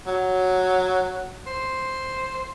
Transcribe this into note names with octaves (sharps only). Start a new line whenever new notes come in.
F#3
C5